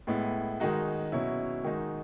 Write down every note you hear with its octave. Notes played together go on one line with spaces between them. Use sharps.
A2 G#3 B3 E4
D#3 G#3 D#4 F#4
B2 F#3 C#4 E4
D#3 G#3 D#4 F#4